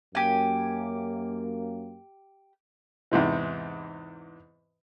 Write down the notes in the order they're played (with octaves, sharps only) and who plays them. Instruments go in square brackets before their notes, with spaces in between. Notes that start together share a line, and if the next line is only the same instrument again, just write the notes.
[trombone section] F#2 A#3 [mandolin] G4 G#5
[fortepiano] E2 G#2 C3 E3